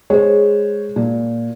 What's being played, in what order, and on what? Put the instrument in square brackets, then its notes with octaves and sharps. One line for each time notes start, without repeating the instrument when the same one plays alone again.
[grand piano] G#3 [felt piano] C5 C#5
[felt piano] A#2